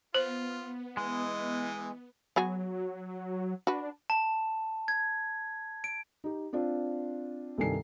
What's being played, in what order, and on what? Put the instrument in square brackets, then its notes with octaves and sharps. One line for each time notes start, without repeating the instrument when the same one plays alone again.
[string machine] B3 [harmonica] F4 [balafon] C5
[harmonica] E3 D#5 [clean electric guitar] G#3
[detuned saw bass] F#3 [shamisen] B3 F#4 G#4
[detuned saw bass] D4 [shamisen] F#4 B4
[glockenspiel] A5
G#6
D7
[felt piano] D#4 G4
C4 D4 F4
C2 G2 D#3 A4 G#5 C7